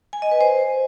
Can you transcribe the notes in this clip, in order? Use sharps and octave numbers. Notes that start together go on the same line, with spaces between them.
G#5
D#5
B4
C5